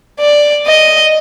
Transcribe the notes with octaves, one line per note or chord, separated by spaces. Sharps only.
D5
D#5